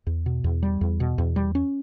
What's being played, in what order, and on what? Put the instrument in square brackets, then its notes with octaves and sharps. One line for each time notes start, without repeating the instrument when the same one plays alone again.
[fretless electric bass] E2
B2
E2
G3
E2
B2
E2
G3
C#4